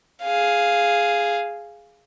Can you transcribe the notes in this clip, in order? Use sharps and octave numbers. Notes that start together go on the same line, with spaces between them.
G#4 F5